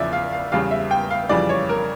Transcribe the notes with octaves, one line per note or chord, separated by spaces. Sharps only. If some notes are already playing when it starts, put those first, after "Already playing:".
Already playing: E2 C#3 F3 D5 E5
F5
F5
E2 C#3 G3 F5
E5
G5
F5
F2 C#3 E3 G3 D5
C#5
A#4